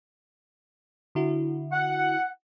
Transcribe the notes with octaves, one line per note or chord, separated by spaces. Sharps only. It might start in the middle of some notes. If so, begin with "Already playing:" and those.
D3 E4 F#4
F#5